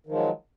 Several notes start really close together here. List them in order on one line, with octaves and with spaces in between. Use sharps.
D#3 F3 G#3 F#3